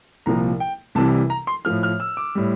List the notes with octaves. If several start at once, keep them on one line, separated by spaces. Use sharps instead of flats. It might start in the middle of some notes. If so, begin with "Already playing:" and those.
C2 A#2 F3 A#5
G5
C2 C3 E3 G3 A5
A#5
C6
A2 F3 F6
F6
E6
D6
A2 G3